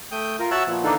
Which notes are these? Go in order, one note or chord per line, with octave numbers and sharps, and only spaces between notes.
A3 G5 D#6 G6
F4 A#4
F#4 C#5 E5 A5 E6 F#6
A#2 F3 B3
D3 E3 A#3 D4 D#4 A4